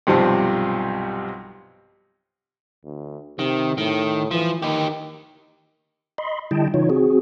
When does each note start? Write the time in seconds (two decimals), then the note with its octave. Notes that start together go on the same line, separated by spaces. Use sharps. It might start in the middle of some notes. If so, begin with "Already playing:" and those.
0.07 B1 G2 C3 F3 C5 A5
2.85 D2
3.39 C3 D#3
3.78 A2 D#3
4.31 E3 F3
4.62 D#3 D#4 G4
6.18 D#5 B5 C6
6.51 D3 G3 E4 D#5 G5 A5
6.74 C#3 E3 D#4 F4 C#5
6.90 C4 F#4 G#4